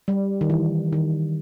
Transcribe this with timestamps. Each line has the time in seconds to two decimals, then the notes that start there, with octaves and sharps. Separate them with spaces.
0.08 G3
0.41 D#3
0.50 E3
0.93 D#3